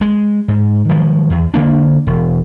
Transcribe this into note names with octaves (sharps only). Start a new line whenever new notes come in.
G#3
G#2
D#3 F3 F#3 G#3
E2
D3 E3 A#3 D4
E1